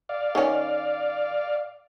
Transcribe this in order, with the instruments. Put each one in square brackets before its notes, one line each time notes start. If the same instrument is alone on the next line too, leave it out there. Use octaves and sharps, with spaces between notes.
[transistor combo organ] D5 F5
[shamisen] D#3 C#4